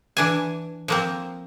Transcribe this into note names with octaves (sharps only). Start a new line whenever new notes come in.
E3 D4 G#5
F3 A#3 C4